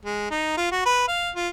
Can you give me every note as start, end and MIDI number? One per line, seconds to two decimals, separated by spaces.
0.05 0.27 56
0.31 0.53 63
0.57 0.70 65
0.72 0.84 66
0.86 1.07 71
1.08 1.30 77
1.35 1.49 65